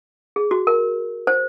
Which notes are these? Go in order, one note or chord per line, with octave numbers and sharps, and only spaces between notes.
G#4
F#4
A#4
C5